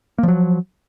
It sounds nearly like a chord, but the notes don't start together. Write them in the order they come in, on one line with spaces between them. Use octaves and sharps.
A#3 F3 F#3